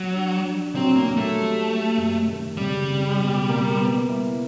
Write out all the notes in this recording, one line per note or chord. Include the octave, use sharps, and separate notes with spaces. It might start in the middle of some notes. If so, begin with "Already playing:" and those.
Already playing: F#3
D4
D4
F#3 C4
A#3
F#3
A3
G3
G3
F#2
D#3
C#3 G3
C#3
B2
A#3
B3
E4